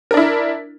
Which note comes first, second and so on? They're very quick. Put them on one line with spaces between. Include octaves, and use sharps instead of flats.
A#4 D4 E4